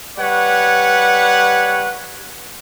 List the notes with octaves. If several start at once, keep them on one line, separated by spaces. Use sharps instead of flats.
G3 B4 C#5 F#5